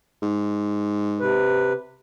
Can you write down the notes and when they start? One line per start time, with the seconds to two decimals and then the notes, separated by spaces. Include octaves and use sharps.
0.22 G#2
1.20 C3 B4